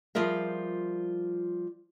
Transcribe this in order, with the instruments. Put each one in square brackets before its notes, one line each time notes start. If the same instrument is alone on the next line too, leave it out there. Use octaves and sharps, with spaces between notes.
[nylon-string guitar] F3 G3 F4 G#4 A#4 E5